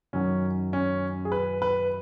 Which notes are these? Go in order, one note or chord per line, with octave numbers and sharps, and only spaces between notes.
F#2 D#3 F#3 C#4
C#4
G#4
B4
B4